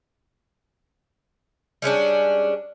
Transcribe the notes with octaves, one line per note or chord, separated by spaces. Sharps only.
G3 G#3 C#4 D4